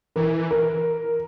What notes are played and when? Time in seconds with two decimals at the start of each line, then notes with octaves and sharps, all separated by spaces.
0.16 E3 A#4
0.51 A#4